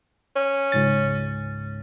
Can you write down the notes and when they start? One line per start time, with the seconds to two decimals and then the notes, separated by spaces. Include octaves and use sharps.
0.37 C#4
0.72 C#2 G#2 A6